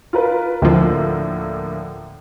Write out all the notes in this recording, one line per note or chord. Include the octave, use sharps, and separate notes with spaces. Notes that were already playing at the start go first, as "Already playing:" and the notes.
F4 A#4 B4
D2 A2 D3 F3 A#3